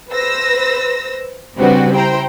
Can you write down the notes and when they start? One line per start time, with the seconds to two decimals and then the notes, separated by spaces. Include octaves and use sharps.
0.11 B4 C5 E6 A#6
1.58 C#3 G3 C4 D4 F#4 B4
1.92 E4 C5 G5 A#5